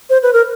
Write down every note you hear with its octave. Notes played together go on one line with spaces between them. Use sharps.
C5
B4
A#4